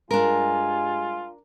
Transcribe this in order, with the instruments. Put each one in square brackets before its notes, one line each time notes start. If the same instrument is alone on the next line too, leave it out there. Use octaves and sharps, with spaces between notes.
[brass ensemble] G2 G#3 G#5 [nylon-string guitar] D4 A#4 [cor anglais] F4